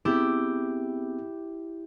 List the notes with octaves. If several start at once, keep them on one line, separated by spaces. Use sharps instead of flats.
B3 C4 E4 G4 G#4